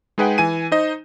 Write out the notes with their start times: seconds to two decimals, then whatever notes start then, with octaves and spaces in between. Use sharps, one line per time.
0.18 G#3 D#4 G#4 B4 F#5 G5
0.38 E3 G#5 D#7
0.72 D#4 C5 D#5